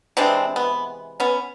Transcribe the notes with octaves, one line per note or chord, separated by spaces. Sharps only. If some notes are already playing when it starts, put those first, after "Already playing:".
C3 E3 G#3 C4 D4
B3
B3 C#4